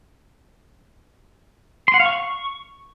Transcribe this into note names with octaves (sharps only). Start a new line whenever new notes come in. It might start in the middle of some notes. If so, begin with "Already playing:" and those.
C6
F#5
F5
C#6